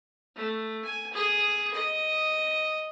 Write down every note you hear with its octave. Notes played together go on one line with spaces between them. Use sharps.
A3
G#5
G#4
D#5